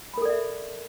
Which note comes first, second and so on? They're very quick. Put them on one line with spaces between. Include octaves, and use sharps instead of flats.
B5 A#4 A4 D5 E5